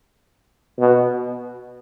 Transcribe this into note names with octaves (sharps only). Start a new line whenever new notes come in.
B2